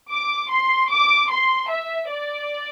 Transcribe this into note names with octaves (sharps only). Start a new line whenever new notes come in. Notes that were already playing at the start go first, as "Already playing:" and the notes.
D6
C6
D6
C6
E5
D5